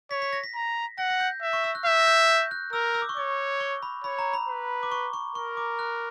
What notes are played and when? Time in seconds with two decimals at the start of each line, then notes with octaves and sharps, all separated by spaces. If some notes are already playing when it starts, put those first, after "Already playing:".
0.10 C#5 B6
0.22 B6
0.33 A#6
0.44 B6
0.55 A#5
0.98 F#5 A#6
1.10 A#6
1.20 G6
1.42 E5
1.53 C#6
1.64 E6
1.75 F#6
1.85 E5 G6
1.99 A#6
2.07 G6
2.29 G6
2.51 F#6
2.73 A#4 E6
2.94 E6
3.02 D6
3.09 C#6
3.17 C#5 D6
3.60 C#6
3.83 B5
4.04 C#5 B5
4.19 A#5
4.33 B5
4.48 B4
4.83 D6
4.92 C#6
5.13 C#6
5.35 A#4 C#6
5.57 D6
5.79 F#6